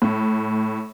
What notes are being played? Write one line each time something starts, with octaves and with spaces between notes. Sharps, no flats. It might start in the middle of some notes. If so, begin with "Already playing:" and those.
A2